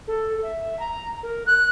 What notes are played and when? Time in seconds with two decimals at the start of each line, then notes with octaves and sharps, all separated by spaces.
0.07 A4
0.43 E5
0.79 A#5
1.23 A#4
1.46 F#6